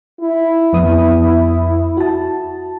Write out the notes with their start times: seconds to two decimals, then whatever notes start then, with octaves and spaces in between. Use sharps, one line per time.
0.21 E4
0.73 F2 B3 D#6
1.97 F#4 A5